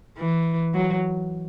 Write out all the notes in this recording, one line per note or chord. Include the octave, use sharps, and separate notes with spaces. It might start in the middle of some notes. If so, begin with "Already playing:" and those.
E3
F#3